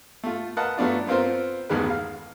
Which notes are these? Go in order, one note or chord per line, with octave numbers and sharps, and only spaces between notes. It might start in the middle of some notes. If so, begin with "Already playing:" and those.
A3 F4
A#4 B4 D#5 F5 F#5 A5
F#3 A3 B3 D4 F4
B3 C4 F4 A#4 C5
A1 E2 D#3 G#3 B4
F5